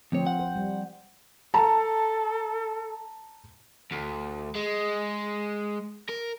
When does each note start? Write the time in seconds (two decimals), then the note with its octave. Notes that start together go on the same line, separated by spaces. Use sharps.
0.12 D2 F3 C4 C#5
0.27 F#5
0.39 C5
0.56 G3
1.54 A4 A5 A#5
3.92 D2
4.55 G#3
6.09 A#4